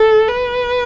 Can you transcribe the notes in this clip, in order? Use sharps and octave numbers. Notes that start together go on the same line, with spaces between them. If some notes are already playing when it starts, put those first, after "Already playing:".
Already playing: A4
B4